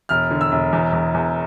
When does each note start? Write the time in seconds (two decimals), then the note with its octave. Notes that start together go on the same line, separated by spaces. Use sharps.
0.09 E1 F6
0.30 D3
0.41 E6
0.52 E1
0.73 E2
0.93 E2
1.14 E2